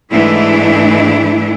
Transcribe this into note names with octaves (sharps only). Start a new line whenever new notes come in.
G#2 E3 A3 D4 E4